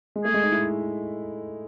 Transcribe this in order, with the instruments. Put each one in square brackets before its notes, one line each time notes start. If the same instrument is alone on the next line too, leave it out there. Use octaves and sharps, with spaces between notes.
[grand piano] G#3
[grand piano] A3 [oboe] G#4
[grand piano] G#3
D#4
E4